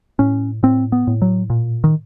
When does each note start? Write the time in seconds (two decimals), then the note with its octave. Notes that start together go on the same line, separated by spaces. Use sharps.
0.19 A2 C#4
0.63 A2 C4
0.92 B3
1.07 A2
1.22 F#3
1.50 A#2
1.84 D#3